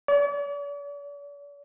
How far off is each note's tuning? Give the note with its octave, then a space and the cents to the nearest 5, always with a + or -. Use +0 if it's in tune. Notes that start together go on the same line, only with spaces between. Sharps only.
D5 -45